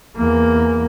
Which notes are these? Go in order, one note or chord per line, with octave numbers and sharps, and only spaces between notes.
E2 A#3